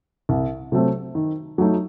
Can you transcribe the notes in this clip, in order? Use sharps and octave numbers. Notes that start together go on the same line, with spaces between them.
C2
C3 F#3 A3 C4
D#3
F#3 A3 D#4